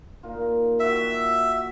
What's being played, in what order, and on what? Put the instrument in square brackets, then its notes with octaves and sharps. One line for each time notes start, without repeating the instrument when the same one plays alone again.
[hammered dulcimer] A#2 D#4 F4
[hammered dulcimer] F#4 G5 [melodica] E5